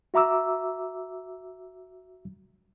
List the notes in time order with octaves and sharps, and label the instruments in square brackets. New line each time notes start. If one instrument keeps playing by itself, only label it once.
[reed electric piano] F#4 E5 A#5 D6 E6